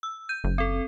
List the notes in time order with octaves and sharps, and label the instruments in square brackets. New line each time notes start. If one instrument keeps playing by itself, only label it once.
[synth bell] E6
G6 D#7
[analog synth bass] F#1
[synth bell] C4 A4